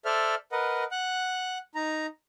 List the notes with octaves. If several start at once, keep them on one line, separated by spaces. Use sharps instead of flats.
A4 C5 D5 E5 F6
A#4 B4 D#5 F#5
F#5 F#6
D#4 A#5